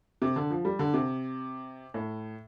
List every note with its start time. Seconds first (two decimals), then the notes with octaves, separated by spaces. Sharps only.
0.22 C3
0.36 D3
0.50 F3
0.65 G3
0.79 D3
0.94 C3
1.94 A2